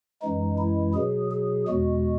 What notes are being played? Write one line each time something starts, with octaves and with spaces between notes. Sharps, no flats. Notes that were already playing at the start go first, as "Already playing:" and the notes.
F#2 E3 G#3 D#4
E4
B2 F#3 G#4
G#4
E2 B2 G#3 F#4